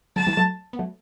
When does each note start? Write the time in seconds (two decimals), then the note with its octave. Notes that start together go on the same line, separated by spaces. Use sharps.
0.16 D3 F#3 A5
0.27 E3 G3
0.37 F#3 A3
0.73 B3
0.79 F#3 A3